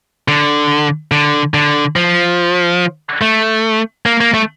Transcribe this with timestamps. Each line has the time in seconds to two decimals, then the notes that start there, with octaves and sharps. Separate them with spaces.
0.28 D3
1.12 D3
1.54 D3
1.96 F3
3.22 A3
4.06 A#3
4.21 A#3
4.34 A3